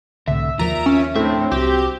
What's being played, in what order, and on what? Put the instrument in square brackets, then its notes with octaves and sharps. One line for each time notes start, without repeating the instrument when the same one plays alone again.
[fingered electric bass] C2 A2 [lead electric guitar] D3 [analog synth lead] E5
[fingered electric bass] D#2 F3 [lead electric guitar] F4 A#4 [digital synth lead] A#5
[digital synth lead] C#4
[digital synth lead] A2 [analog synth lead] C4 [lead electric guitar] D4 E5
[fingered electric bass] C2 [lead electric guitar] F#4 [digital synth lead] G4